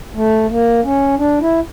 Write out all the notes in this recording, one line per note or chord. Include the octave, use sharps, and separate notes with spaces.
A3
A#3
C#4
D4
E4